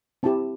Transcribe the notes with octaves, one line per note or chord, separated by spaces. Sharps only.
C4 E4 G4 A5